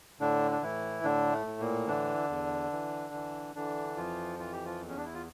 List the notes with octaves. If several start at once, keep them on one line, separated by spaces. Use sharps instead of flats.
A2 D3 D4
D4
A2 E3 E4
A2 D3 D4
A3
A2
A#2 A#3
D3 E3 D4
E2
E3
E3
D3 E3 D4
F2 F3 F4
E3 F4
G4
F3 F4
E2
C#4
D4
E4
F4